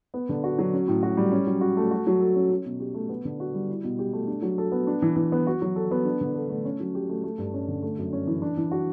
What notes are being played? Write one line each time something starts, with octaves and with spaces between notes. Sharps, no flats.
B3
D3
F#4
F#3
C#4
A2
F#4
G3
C#4
F#3
F#4
A3
F#4
F#3
A4
C#4
C#4
B2
G4
A3
B3
D3
F#4
G3
E4
B2
G4
A3
D4
F#3
A4
B3
D4
E3
E3
B3
F#4
F#3
A4
B3
D4
D3
A4
A3
C#4
F#3
G4
A3
A3
G2
C#4
D3
A3
F#2
C#4
E3
D4
E3
F#4